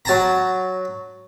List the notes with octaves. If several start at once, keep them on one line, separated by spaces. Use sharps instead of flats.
F#3 A5 A#5